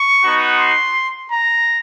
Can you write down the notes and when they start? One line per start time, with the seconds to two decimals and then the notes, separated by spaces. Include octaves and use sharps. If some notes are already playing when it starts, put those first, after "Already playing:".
Already playing: C#6
0.23 B3 D#4 F#4
0.58 C6
1.29 A#5